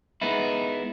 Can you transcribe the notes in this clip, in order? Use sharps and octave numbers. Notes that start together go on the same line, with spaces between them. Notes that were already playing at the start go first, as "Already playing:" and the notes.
G#3 B3 D#4 E4